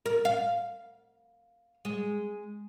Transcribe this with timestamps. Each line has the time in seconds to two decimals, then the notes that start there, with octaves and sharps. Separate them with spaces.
0.06 A#4
0.25 F5
1.85 G#3